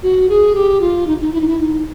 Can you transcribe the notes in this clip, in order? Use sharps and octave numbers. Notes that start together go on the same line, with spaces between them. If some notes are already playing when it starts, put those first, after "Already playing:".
F#4
G#4
G4
F4
D#4
D#4
E4
D#4
E4
D#4